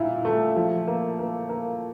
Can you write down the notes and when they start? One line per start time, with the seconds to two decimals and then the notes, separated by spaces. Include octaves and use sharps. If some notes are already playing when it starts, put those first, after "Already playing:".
Already playing: A#2 E4
0.25 A3
0.56 F3
0.87 A#3
1.19 A#3
1.49 A#3